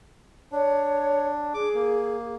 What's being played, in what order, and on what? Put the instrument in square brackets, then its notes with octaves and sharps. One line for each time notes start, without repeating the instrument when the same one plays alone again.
[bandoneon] D4 [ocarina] C#5
[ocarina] G#4 [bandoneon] D6
[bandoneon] A#3